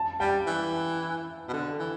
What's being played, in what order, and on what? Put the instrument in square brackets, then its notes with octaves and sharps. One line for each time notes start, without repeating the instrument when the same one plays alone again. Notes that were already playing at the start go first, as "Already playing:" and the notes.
Already playing: [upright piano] A5
[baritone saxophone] G3 [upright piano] G5
[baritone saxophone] E3
B2
D3
E3